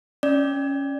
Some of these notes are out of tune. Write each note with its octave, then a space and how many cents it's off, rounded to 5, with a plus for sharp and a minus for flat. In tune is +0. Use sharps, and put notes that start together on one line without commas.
C#4 +0 D5 +0